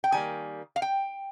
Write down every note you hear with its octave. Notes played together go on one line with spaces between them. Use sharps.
G5
D#3 G3 A#3 G#5
F5
G5